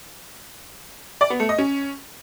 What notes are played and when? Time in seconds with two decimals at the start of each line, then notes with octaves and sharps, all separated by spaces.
1.21 D5
1.30 B3
1.40 A3
1.49 D#5
1.58 C#4